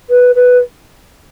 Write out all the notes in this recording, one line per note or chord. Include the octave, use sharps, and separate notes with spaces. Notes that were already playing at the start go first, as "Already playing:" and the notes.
B4
B4